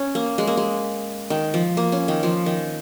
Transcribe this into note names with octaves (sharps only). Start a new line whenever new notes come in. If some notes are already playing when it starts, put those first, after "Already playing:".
Already playing: C#4
A#3
G#3
A#3
G#3
D#3
F3
A#3
C#4
D#3
F3
D#3